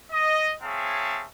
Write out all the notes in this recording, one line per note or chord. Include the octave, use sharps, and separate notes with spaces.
D#5
C4 G#4 C#5 E5 F5 A5